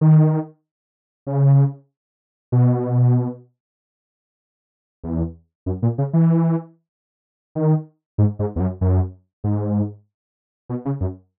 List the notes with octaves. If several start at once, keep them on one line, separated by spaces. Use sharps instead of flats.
D#3
C#3
B2
E2
F#2
A#2
C#3
E3
D#3
G#2
G#2
E2
F#2
F#2
G#2
B2
C#3
F#2